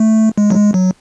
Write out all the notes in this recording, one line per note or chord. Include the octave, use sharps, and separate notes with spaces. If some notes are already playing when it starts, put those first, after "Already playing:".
Already playing: A3
G#3
F#3
G#3
F#3